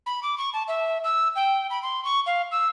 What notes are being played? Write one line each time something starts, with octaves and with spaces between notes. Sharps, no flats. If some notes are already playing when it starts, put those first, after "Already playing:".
B5
D6
C#6
A5
E5
E6
G5
B5
C6
C#6
F5
E6